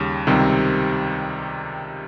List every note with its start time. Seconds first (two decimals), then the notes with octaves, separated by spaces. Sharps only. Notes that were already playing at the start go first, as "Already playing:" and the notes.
Already playing: D#2 C#3 G3
0.27 C#2 C3 D#3 G3 C4